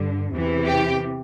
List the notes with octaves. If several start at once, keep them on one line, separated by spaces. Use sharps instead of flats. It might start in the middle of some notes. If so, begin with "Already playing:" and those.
Already playing: G2 D3
E2 C3 E3
G4